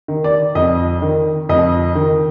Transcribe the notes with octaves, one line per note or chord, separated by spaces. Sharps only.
D#3
D5
F2 D#5
D#3
F2 D#5
D#3